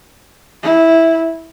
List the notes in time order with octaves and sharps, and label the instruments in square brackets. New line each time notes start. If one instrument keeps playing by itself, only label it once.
[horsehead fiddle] E4